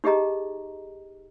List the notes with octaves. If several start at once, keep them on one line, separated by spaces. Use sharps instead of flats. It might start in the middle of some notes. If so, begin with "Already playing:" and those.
D#4 G4 G#4 D#5 A#5